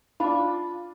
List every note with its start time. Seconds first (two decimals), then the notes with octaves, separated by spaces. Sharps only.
0.20 D4 F4 B5 D6